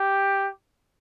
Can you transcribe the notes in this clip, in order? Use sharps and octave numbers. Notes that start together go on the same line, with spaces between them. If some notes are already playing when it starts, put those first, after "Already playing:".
Already playing: G4